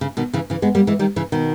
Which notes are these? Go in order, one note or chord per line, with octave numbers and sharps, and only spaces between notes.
C#3
B2 D#3
C#3 E3
C#3 E3
G#3 B3
G3 A#3
E3 G#3
D#3 G3
C#3 E3
B2 D#3